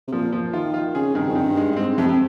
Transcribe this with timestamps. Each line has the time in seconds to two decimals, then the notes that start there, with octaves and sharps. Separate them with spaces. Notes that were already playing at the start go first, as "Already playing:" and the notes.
0.08 C3
0.13 A#2 F3
0.33 F3
0.53 D#3 F4
0.74 F4
0.95 C#3 G#4
1.15 G2 D#3
1.27 F2
1.35 G2 D#3
1.57 G#3
1.72 G2
1.77 G#2 C4
1.98 F2 C3
2.08 C3